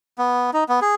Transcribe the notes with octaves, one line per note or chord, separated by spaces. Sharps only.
B3
D#4
B3
G#4